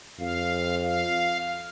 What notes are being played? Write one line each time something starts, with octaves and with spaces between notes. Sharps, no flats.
F2 F5
F5